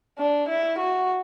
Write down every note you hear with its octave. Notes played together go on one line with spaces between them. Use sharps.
D4
E4
F#4